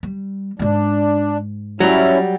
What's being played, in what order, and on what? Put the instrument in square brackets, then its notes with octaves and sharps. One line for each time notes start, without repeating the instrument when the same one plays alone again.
[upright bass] G3
[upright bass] G#2 G#3 [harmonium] D4
[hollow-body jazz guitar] F#3 G3 [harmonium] C#4 E4